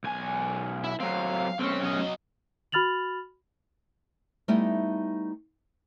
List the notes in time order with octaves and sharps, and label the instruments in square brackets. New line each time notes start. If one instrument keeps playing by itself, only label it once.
[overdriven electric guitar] B1 G#5
[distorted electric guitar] E4
[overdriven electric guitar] F#3 C4 [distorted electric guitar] F5
[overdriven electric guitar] B1 C#4 [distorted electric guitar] C4
[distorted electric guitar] F#3 D#5
[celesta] F#4 B5 F6 A6 F7 F#7
[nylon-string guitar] G3 A3 B3 D#4 E4 G4